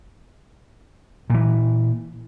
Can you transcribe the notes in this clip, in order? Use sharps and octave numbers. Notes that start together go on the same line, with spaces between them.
A#2 E3